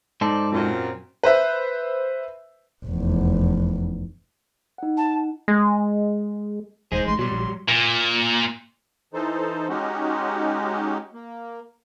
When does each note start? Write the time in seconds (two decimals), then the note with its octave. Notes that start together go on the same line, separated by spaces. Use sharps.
0.21 G#2 D#4 A4 C5 D5
0.52 F#2 A#2 C4
1.24 B4 C5 E5
2.85 F1 E2
4.78 D#4 F#5
4.97 A5
5.48 G#3
6.92 E1 G#3 D#4 G#4 C5
7.07 A1 C6
7.19 B2 F#3 G3 C6
7.32 A#1
7.69 A#2
9.14 E3 D#4 A4 C5
9.69 G#3 C#4 D#4 F#4 G4
11.14 A#3